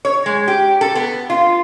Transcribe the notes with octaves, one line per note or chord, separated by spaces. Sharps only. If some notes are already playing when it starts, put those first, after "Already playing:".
C#5
G#3
G4
A4
B3
F4